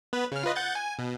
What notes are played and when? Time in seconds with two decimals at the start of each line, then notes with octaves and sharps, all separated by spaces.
0.13 B3 B4
0.32 C#3 F6
0.43 F4 B4 D#5
0.56 F#5 G6 A6
0.75 G#5
0.99 B2